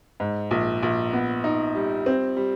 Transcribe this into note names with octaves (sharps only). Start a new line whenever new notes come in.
G#2
A#1
A#1
B3
D#4
G3
C4
G3